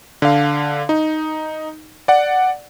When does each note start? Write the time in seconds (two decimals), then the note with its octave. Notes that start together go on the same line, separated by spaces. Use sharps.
0.22 D3 F5
0.89 D#4
2.08 D5 F#5